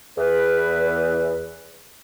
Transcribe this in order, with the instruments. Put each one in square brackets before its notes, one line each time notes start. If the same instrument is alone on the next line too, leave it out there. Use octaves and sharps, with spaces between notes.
[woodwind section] E2 B4